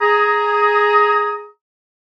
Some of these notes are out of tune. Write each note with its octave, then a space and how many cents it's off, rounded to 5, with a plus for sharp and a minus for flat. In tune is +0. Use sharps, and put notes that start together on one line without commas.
G#4 +0 A#5 +0 D#6 +20